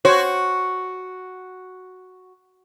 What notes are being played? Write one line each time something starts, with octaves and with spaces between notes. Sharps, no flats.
F#4 C5 C#5